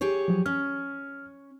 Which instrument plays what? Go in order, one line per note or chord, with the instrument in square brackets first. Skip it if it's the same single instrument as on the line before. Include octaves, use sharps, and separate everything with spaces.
[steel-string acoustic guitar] G4 G#4 C#5
[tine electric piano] F3 F#3
[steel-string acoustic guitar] C#4 [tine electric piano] F6